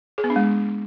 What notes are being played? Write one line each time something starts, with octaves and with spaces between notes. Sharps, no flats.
G#4
B3
D4
G#3